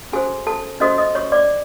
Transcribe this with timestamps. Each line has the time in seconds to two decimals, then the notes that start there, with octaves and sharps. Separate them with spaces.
0.12 C#4 F#4 G#4 A4 C5 G#5
0.47 A4 A5
0.80 C#4 F#4 A4 C5 D#5 D#6
0.98 D#5 D#6
1.15 C#5 C#6
1.32 D5 D6